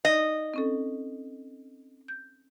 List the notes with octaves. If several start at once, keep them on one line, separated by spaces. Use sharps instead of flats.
D#4 D5 D#5
C4 C#4 A4
G6